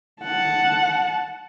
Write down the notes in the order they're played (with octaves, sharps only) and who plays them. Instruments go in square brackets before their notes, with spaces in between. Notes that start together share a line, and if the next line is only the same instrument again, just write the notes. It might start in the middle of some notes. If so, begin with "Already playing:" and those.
[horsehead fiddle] F#5 A5